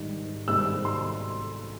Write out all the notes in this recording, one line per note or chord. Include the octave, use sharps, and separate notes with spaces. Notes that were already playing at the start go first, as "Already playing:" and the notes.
Already playing: G#2 D#3 G3
G#2 D#3 G3 C4 E6
C6